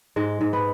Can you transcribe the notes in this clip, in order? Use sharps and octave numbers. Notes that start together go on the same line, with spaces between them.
G#2 G#3
G#2
B3